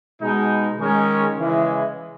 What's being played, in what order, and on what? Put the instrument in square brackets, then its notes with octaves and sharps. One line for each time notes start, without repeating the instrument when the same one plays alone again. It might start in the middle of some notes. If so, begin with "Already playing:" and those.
[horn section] B2 G#3 D#4
D#3 G#3 C#4
C#3 E3 G#3